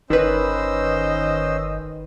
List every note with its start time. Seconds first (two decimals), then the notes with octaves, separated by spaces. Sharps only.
0.10 G1 D#3 C#4 B4 C5 D#5 E6